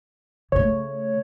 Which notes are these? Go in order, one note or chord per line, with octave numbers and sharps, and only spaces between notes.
C#3 A3 C#5